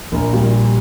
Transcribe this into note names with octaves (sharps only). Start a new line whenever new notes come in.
A#1 A#4
A#2 G3